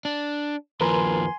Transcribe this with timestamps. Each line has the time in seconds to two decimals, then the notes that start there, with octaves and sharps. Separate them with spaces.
0.05 D4
0.81 D#2 F3 A#4 B4 G#5 A#5 C6